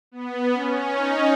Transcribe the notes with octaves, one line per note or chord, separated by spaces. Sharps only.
B3
C#4
D#4